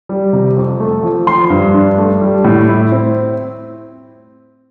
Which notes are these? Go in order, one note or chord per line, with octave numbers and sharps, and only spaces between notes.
G3
C3
F2
A3
F3
F3 C6
G2
D4
A3
G3
A2
E4
C4